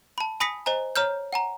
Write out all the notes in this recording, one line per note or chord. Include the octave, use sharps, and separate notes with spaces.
A5 B5
G#5 B5 D#6 A#6 B6 C#7
C5 D#5 G#5 A#5
C#5 A#5 F6 G6
F#5 G#5 A#5